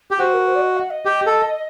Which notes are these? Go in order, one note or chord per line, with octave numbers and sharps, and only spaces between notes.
G4
F#4 C5
A#4
C5
D5
D#5
F#5
D#5
G4
A4